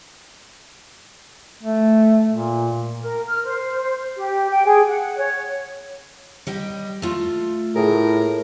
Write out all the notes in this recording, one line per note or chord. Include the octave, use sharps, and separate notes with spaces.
A3
A#2
A#4
F6
C5
G4
G5
G#4
F#5
C#5
G3 D#5 G5
A3 F4
A2 G#4 A#4